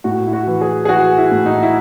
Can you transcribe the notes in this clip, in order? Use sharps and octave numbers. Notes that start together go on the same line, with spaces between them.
A2 F#4
E4
F#4
E3
G#4
G#4
E3 F#4
E4
A2
D#4
E4